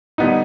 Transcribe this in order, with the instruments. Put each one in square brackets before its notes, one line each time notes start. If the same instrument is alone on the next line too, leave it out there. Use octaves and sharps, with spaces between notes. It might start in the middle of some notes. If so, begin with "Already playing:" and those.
[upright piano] D3 G3 B3 D#4